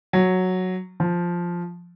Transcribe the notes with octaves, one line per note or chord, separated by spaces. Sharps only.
F#3
F3